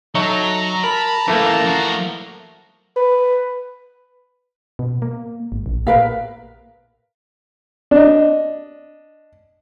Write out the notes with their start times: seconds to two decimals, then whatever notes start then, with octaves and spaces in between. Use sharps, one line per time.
0.15 F#3 D#4 A4 C#5 E5 A#5
0.84 A#4 A5 B5
1.28 F#2 A#2 E3 A3 A#3
1.64 F3 F#4
2.96 B4
4.79 B2
5.02 A#3
5.52 G#1
5.66 A#1
5.87 A#2 A#4 B4 F5
7.91 D4 D#5